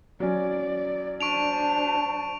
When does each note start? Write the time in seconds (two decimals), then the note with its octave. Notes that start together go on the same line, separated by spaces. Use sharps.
0.20 F#3 C#4 D5
1.21 D4 C5 A5 C#6 D7 F7